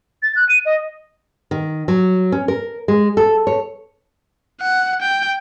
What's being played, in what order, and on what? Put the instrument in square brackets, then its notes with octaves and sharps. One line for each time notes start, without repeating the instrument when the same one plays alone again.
[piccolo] A6
F#6
D#7
D#5
[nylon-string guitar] D#3
F#3
C#4
A#4
G#3
A4
C#5
[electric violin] F#5
G5